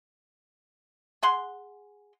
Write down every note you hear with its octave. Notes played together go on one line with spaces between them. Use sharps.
G#4 F#5 C6